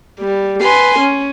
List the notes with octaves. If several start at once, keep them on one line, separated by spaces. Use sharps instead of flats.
G3
B4 G#5 C6
C#4